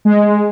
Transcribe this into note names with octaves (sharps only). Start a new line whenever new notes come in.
G#3